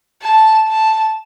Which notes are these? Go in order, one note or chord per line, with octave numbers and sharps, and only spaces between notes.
A5
A5